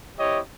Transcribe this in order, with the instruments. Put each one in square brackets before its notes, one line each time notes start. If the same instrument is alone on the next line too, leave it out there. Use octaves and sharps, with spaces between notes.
[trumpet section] C4 E4 G4 C#5 D#5